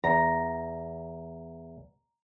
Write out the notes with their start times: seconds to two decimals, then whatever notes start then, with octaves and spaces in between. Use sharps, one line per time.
0.04 E2 A#5